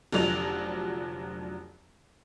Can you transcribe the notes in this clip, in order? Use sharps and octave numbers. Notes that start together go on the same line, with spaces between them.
F1 D3 F3 F#3 D5 F7